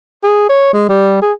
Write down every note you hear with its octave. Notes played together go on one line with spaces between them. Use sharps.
G#4
C#5
G#3
G3
G#4